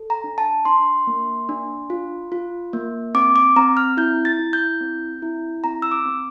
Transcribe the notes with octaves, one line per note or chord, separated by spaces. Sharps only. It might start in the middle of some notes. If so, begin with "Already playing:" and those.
Already playing: A4
A#5
D4
A5
D4 C6
A#3
D4
F4
F4
A#3
C4 D6
D6
C4 A#5
F6
E4 G6
A6
E4
G6
C4
E4
C4 A#5
E6
D6
C4